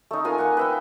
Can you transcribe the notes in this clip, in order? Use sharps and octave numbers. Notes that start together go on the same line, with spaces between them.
A3 D#4
F4 A#4 G#5
A#3 F#5
B4 E5 G5